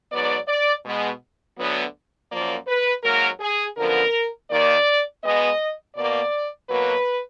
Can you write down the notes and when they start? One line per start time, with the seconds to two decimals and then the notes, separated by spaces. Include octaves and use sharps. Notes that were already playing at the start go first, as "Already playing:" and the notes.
0.11 G#2 F#3 B3 D5
0.48 D5
0.85 B2 G#3 B3
1.57 D2 D3 F#3 B3
2.30 F#2 F3 A#3 D5
2.67 B4
3.03 G#2 F#3 A#3 A#4
3.40 G#4
3.77 F#2 D3 F3 B3 A#4
4.50 D#2 D#3 A#3 D5
5.23 B2 G#3 B3 D#5
5.96 B2 A#3 D5
6.69 B2 F#3 A#3 B4